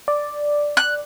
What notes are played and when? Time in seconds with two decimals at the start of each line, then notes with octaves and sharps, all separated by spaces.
0.08 D5
0.77 F#6